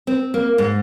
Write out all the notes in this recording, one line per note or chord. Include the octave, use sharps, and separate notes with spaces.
C4
A#3
G#2